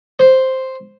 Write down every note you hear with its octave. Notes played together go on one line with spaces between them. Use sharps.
C5